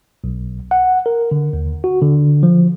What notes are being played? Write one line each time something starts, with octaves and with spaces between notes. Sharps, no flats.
B1
F#5
A#4
D3
D#2
F#4
D3
F3